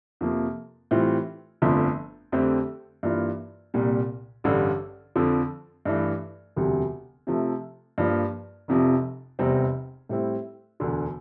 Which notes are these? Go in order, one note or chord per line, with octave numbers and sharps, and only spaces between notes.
F2 C3 F3 A#3
A2 E3 G3 C4 F4
G1 F2 D3 F3 A3
F2 D3 A3 C4 G4
G2 E3 A#3 F4
C2 A#2 G3
A1 G2 D3 G3
F2 D3 F3
G2 E3 A3
E1 D2 C3 G3
C3 F3 A3
G2 F3 A#3
F1 F2 C3 F3
F1 E2 C3 G3 C4
A2 G3 C4 E4
E1 D2 D3